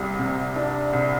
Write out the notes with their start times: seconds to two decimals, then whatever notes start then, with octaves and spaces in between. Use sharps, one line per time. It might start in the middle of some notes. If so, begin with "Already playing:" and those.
Already playing: C2 G3
0.19 C3
0.56 D4
0.93 C2